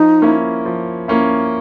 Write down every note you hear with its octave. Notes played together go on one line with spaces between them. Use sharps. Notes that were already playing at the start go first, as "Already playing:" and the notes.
Already playing: F3 D#4
A#3 C#4 E4
F3
A#3 C#4 E4